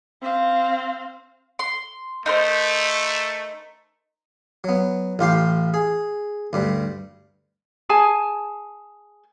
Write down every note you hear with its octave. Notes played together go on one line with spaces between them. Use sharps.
C4 F5
C6
A3 D#4 A#4 C5
F#3 B3
A1 F4 G4 C6
G#4
D2 G2 G3
G#4 G#5 A5